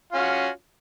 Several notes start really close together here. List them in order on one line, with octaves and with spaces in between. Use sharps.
F4 C#4 F#4